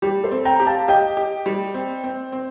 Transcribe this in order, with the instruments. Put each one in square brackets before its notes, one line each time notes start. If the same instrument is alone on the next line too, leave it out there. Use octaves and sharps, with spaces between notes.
[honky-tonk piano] G3 [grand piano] G4
[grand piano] A4 C5
[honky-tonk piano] C4
[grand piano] G5 A#5
[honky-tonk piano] G4
[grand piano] F5 A5
[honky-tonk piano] G4 [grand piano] D#5 G5
[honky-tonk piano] G4
G3
C4
C4
C4